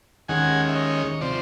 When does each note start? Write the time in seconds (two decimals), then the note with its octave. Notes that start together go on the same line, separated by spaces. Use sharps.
0.28 D#2 D#3 G#3 C#4 F#5 G#5
0.69 E5
0.75 C#5 D#5
1.21 C3 F3 C5 D5